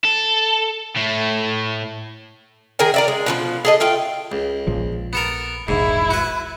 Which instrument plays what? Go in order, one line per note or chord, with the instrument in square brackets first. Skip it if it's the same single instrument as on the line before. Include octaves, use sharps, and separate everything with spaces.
[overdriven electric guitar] A4
A2 A3
[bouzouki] D#3 G#4 A#4 G#5
A#4 D5 E5
G#3
B2 D#3 F3
G#4 A4 D#5
A3 F4 G5
[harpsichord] C#2
[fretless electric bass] A#1 A#2 F3
[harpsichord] B3 A4 A#4
[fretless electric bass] E1 A#1 D#3 [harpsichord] G#2 [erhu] E4
[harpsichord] F#4 B4